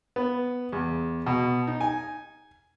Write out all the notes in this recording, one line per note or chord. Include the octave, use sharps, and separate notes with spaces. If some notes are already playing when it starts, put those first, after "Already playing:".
B3
E2
B2
D#4
G#5